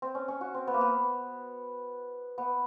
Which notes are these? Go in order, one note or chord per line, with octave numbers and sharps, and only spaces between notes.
C4
C#4
C#4
F#4
C4
B3
A#3
B3
B3